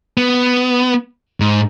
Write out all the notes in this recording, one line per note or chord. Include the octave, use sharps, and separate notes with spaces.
B3
G#2